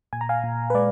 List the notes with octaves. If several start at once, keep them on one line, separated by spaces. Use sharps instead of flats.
A#2 G#5
A#5
F5 G#5
A#2
B4
G#3 D5